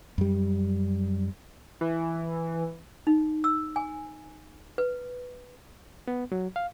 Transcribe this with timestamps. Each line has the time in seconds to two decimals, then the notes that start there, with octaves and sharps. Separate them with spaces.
0.18 F#2 G3
1.81 E3
3.07 D#4
3.44 E6
3.76 G#5
4.78 B4
6.08 B3
6.32 F#3
6.56 F5